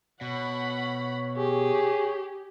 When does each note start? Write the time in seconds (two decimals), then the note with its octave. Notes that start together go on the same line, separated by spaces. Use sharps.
0.21 B2 C#5 F#5 B5
1.37 G4 G#4